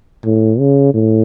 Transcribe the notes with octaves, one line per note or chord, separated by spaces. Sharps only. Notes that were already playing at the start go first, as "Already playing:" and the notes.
A2
C#3
A2